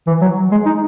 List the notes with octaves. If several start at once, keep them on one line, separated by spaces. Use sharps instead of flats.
E3
F#3
G#3
D#4